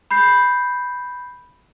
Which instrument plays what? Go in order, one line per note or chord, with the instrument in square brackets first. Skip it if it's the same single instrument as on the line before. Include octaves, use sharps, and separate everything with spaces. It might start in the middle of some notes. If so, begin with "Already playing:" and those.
[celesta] B5 G6 C7